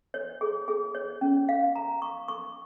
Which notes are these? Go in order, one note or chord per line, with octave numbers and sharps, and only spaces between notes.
C#5
G#4
G#4
C#5
C#4
F5
A#5
C#6
C#6